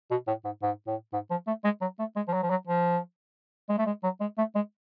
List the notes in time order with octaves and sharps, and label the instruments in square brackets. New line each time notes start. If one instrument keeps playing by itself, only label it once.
[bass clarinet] B2
A2
G#2
G#2
A2
G#2
F3
A3
G#3
F#3
A3
G#3
F3
F#3
F3
F#3
F3
G#3
A3
G#3
F#3
G#3
A3
G#3